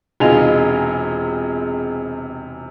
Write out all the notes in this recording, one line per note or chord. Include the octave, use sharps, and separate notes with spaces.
E1 C3 D#4 F4 G#4 F7